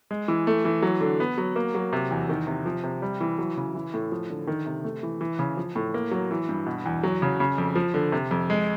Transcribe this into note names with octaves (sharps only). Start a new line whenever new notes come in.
G#3
E3
A3
E3
F#3
D3
B3
F#3
A#3
F#3
C3
E2
D#3
C3
F3
C3
G3
E3
F#3
C#3
E3
A2
F3
D3
D#3
C3
A3
E3
E3
C#3
F3
A2
A#3
F#3
E3
G2
B2
E2
F#3
C#3
C#3
F2
F3
D3
C3
F2
G#3